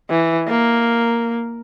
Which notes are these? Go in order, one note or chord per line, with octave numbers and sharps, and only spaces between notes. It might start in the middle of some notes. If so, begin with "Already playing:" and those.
E3
A#3